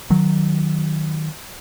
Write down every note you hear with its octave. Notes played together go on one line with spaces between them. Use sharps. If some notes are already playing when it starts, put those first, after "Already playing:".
D#3 F#3